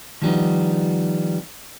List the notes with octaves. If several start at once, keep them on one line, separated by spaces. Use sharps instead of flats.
D#3 F3 G3 B3 D#4